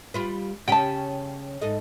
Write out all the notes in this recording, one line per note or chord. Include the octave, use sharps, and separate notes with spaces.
G3 F4 B4
C#3 C#4 G4 G5 A5
G#2 A4 D#5